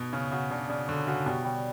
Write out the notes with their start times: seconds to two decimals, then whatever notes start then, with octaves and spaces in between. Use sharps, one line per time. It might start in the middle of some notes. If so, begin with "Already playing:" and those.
Already playing: B2
0.13 C#3 C#5
0.31 C#3 F#4
0.50 C#3 D4
0.69 C#3 D4
0.88 D3 C#5
1.07 C#3 F#4
1.26 B2 G3
1.45 G3